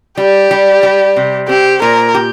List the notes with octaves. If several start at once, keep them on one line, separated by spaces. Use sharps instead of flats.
G3 G4
G3
G3
C3
C4 G4
A#2 A#4
G4